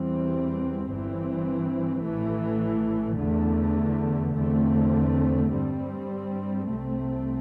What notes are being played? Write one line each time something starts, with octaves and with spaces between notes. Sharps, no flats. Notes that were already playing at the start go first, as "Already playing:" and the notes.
Already playing: E2 E3 G3 C4
G1 G2 E3 C4
A1 A2 E3 A3
E2 D3 A3
E2 D3 A3 C4
G2 G3 C4
C2 C3 A3 C4